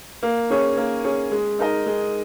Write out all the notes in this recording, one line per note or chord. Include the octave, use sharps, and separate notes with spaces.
A#3
C#4 G#4 C#5
A#3
C#4 G#4 C#5
G#3
D#4 A#4 D#5
G#3